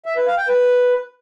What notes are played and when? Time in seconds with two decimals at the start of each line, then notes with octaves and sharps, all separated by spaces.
0.06 E5
0.16 B4
0.27 F5
0.38 G5
0.48 B4